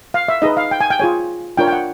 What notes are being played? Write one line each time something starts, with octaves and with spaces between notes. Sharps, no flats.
F5
E5
D#4 G#4 B4 D#5
F5
G5
G#5
G5
F4 G#4 C#5 G#5
D4 F4 A#4 C#5 G5
G5
F#5